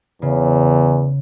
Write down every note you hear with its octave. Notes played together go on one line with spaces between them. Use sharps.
E2 C#3